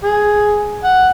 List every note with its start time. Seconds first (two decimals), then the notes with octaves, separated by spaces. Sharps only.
0.04 G#4
0.84 F#5